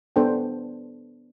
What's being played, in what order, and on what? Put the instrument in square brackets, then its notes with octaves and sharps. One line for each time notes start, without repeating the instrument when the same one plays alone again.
[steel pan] B3 D4 A4 C5 G5